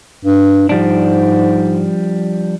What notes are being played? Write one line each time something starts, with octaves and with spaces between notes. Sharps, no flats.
G2
G#2 F3 G3 D4